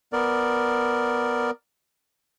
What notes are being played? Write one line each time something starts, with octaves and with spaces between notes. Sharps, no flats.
B3 A#4 D5